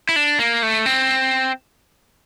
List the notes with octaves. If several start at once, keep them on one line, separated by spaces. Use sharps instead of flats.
E4
D4
A#3
A3
C4